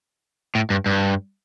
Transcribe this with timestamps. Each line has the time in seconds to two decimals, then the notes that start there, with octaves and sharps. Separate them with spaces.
0.55 A2
0.70 G2
0.86 G2